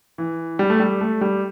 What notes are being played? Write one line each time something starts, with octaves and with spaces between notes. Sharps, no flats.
E3
G3
A3
G3
A3
G3